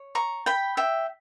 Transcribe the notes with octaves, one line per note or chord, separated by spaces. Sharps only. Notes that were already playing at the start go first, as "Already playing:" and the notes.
Already playing: C#5
A#5 C#6
G5 B5
E5 G5